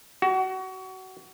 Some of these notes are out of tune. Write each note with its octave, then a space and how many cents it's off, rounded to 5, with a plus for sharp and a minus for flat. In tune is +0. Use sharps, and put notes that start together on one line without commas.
F#4 +25